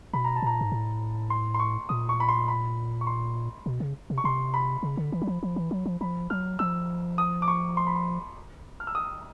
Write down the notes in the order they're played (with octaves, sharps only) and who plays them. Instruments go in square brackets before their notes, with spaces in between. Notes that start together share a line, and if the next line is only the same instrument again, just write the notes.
[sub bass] B2 [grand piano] B5
[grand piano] A#5
A5
[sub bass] A#2 [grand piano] A#5
[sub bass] G#2
A2
[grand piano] C6
C6
C#6
[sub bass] A#2 [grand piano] D#6
[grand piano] C#6
B5
C6
B5
C#6
C6
[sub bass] B2
C#3
C3
[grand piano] C#6
[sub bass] C3 [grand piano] C6
[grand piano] B5
[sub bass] C#3
D3
E3
F#3
F3
F3
E3
F#3
F3
[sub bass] F3 [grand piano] B5
[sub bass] F#3 [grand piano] F6
[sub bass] F3 [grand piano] E6
[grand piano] D#6
D6
C#6
C6
B5
C6
F6
E6
D#6